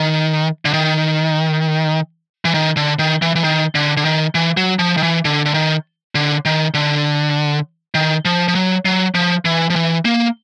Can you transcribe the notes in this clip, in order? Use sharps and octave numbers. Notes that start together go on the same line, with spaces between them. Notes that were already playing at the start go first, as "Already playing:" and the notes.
Already playing: D#3
D3
D#3
E3
D#3
D3
D#3
E3
E3
D#3
D3
D3
D#3
E3
F#3
F3
D#3
E3
D3
D3
D#3
D3
D#3
D3
D#3
F3
F3
F#3
F#3
F3
E3
F3
E3
A#3